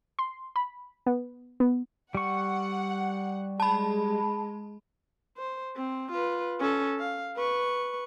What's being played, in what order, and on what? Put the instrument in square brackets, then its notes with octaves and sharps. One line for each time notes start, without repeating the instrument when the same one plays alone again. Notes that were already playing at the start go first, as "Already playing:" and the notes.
[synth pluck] C6
B5
B3
B3
[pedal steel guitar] G3 C#6 [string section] F#5
[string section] G#3 [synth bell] A5 B5
[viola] C5
C4
F4 B4
C#4 A4
F5
B4 C#6